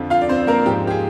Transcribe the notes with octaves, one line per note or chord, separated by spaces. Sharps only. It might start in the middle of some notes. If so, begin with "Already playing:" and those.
Already playing: F2 D3 F3
F4 F5
D5
C4 C5
A#3 A#4
G#2 F3 G4
G4
G#4